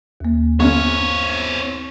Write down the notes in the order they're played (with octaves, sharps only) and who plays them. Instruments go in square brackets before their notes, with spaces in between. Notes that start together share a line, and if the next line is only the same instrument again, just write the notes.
[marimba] D#2 A#3
[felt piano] G1 C#4 [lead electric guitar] C4 C#5